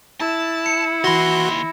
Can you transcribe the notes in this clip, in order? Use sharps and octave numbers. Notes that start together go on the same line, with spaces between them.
E4 A5
C#7
D#2 E3 F#4 B5 C6 A#6